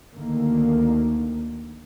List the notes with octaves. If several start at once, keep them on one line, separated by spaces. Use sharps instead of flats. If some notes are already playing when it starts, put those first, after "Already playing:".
D2 D3 D#3 A#3